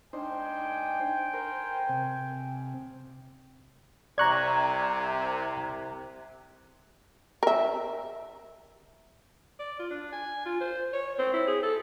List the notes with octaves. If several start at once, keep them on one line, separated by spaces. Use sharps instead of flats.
D4 D#4 C5 G5 G#5
A#4 C5
C3
C2 C3 D5 A#5 C#6 F#6 G#6
A#4 E5
D5
F4
D4
G#5
F4
C5
C#5
C4
E4
G#4
A4